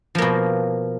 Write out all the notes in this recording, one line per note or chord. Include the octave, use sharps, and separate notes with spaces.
B2 F3 A#3